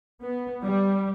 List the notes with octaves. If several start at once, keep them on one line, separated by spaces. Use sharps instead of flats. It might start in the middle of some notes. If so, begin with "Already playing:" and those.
B3
G3